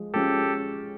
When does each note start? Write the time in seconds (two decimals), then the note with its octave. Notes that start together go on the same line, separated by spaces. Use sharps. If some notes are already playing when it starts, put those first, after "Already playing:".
Already playing: F3 G#3
0.14 F3 G#3 C#4 G4 A4